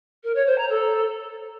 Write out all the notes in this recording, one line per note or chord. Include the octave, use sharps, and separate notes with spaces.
A#4
C#5
C5
A#5
A4